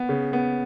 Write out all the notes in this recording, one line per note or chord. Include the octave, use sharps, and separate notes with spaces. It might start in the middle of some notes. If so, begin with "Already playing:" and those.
Already playing: B3
C#3
B3